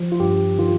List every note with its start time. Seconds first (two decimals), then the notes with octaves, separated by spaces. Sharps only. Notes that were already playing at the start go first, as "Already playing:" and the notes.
Already playing: F3
0.12 F4
0.20 G2 G4
0.59 D#3 F4